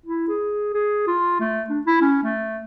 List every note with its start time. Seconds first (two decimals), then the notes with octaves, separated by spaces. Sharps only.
0.06 E4
0.28 G#4
0.74 G#4
1.07 F4
1.40 A3
1.70 D4
1.86 E4
2.01 C#4
2.23 A3